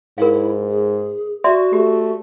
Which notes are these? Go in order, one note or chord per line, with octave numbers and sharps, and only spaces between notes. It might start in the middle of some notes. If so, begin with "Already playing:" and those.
G#2 E4 A#4 F5
G#4
F#4 D5 E5 C6
A3 G4